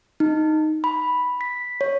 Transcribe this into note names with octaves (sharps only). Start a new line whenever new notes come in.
D#4
B5
B6
C#5